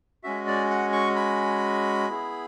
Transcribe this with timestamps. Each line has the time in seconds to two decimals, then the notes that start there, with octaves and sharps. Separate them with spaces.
0.24 G#3 C#4 F#4 E5
0.47 D5
0.70 F#5
0.93 C#6
1.16 B5
2.08 B3 E4 G#4